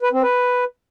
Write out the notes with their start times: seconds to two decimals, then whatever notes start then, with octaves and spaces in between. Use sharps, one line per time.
0.03 B4
0.13 C4
0.23 B4